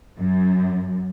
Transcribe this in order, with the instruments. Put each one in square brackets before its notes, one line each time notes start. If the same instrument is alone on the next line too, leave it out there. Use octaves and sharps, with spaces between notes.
[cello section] F#2